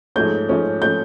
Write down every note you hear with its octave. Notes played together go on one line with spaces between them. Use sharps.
G#2 F3 A3 C#4 G6
G#2 F3 A3 C#4
F3 A3 C#4 G6